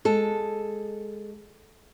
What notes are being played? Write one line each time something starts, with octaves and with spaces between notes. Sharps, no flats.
G#3 A4